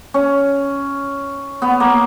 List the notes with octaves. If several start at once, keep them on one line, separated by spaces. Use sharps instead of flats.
C#4
B3
A#3